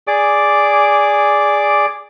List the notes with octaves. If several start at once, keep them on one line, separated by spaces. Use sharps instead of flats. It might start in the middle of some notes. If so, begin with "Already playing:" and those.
G#4 D5 D6